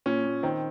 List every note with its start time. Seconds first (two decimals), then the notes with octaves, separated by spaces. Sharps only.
0.06 A#2 C#4
0.24 A#2
0.43 D#3 C4